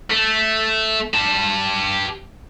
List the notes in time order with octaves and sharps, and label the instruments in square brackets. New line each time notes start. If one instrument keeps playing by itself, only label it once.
[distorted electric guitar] A3
G4 A5